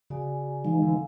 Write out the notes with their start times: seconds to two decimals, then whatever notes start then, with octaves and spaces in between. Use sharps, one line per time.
0.10 C#3 F#4 D5 G#5
0.65 E3 G#3 D#4 F5 G#5
0.82 D3